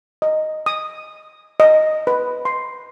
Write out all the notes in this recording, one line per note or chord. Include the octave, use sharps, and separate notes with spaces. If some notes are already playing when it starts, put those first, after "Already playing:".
D#5
D#6
D#5
B4
C6